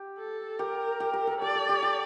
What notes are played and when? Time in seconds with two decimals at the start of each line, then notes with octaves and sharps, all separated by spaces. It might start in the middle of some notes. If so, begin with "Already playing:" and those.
Already playing: G4
0.18 A4
0.59 G4 A#4
1.00 G4
1.13 G4
1.27 A4
1.41 G4 D5
1.55 A4
1.69 G4
1.82 G4